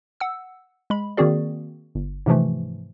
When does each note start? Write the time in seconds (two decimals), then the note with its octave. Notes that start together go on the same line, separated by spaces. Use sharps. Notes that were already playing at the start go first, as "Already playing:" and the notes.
0.20 F#5 E6
0.90 G#3 B5
1.17 D#3 A#3 C4 F#4 G#4 D5
1.95 G1
2.26 G#2 C3 E3 F3 A3